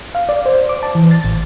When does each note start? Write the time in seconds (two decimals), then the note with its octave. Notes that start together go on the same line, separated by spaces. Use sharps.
0.15 F5
0.29 D5
0.46 C5
0.69 D6
0.83 A5
0.95 E3
1.11 A6
1.25 A1